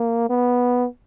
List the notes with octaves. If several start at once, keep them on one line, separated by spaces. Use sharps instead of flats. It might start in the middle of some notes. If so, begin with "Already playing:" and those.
Already playing: A#3
B3